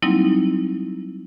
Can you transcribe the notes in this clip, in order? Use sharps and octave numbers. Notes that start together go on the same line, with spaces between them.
F#3 G3 A#3 C4 D#4 E4